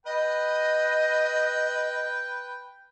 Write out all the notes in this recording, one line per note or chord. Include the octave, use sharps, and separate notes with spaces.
B4 D#5 G5